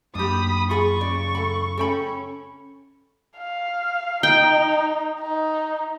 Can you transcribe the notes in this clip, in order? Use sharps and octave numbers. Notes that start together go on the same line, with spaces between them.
F#2 A#3 D4 G4 B5 D#6
F4 G#4 B5 C#6
C#3 D5
A4 B5
C#4 A4 G5 B5
F5
D#4 G5
D#4